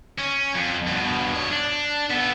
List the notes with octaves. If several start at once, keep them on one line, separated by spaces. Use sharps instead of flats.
C#4
F2
G2 B2
G2 C#5
D4
B3 A4